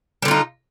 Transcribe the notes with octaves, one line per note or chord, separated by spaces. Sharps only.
D3 G3 D#4 F4